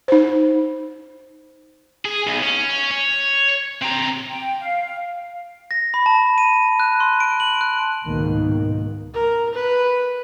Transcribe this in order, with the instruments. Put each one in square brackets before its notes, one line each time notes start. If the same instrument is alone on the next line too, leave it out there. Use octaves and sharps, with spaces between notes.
[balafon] D#4 C5
[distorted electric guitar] G#4
B1
C#4
C#5
C4 A#5
[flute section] G5
F5
[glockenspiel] A#6
B5
A5
D#7
F#6
C6
D7
F#7
F#6
[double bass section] C#2 G#2 B2 D#3 A#3
[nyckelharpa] A#4
B4